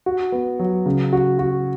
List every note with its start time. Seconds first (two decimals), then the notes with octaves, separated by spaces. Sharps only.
0.06 F#4
0.32 B3
0.59 F#3
0.86 C#3
1.13 F#4
1.39 F#4